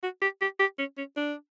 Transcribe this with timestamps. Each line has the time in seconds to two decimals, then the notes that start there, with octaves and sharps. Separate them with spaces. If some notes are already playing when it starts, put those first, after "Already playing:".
0.03 F#4
0.22 G4
0.41 G4
0.59 G4
0.79 C#4
0.98 C#4
1.17 D4